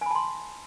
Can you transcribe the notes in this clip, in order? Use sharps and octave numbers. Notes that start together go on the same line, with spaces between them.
G#5 A5 B5 C6